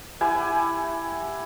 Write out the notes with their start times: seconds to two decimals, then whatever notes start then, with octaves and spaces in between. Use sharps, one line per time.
0.21 E4 G4 F#5 G#5